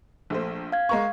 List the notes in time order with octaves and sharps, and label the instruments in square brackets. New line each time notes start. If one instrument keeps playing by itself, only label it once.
[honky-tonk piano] A#1 A3 C5
[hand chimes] F5 G#6
[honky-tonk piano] G#3 A#4 C#6